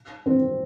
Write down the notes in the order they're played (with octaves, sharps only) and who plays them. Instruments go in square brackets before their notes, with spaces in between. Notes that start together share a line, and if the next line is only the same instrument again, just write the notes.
[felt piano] C4